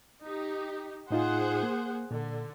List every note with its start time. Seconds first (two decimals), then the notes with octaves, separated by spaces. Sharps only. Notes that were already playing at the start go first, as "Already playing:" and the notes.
0.22 D#4 G4
1.11 A2 D#4 F4 G#4 C5 F#5
1.63 A#3
2.11 A#2 D3